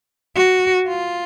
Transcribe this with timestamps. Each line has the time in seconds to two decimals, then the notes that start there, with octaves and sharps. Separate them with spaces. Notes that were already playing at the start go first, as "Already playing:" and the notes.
0.36 F#4
0.87 F4